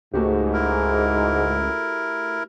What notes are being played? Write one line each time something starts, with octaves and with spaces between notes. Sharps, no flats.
C#2 G#2 A3 F#4 G4
E4 A#4